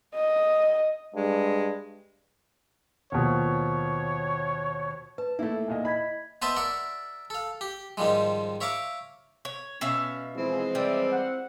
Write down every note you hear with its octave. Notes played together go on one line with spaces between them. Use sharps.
D#5
G2 G#3
D#2 B2 F3 C#5
B4 A5
A3 A#3 D#4 E4 A5
E2 A#2 D#5
D#5 B5 G#6 B6
B3 B4 C5 D#5 E5 A5
A#4 D5 E5 F#5
A4 F5
G4
G#2 D#3 F3 G3 G#3
C#5 E5 F5 A#5 D6
C#5
B2 C#4 E5 F5
E3 F3 G#3 C4 E4
G3 D5 E5
F#5